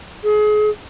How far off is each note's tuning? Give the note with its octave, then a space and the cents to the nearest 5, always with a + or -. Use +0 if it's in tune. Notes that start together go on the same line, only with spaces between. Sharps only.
G#4 +30